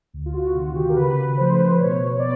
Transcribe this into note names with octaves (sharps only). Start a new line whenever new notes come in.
D2
F4
F#4
C3 D#3 F#4
G4
A#4
C#3 B4
F3 A3 C5
B2 C#5
B3 D5